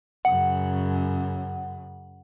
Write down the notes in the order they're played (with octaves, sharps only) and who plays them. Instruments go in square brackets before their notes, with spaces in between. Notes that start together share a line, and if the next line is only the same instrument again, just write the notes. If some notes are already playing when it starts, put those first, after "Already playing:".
[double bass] F#2 C#3 [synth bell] F#5